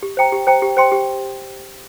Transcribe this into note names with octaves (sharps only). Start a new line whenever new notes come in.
G4
C5 G5 A#5
G4
C5 G5 A#5
G4
C5 G5 C6
G4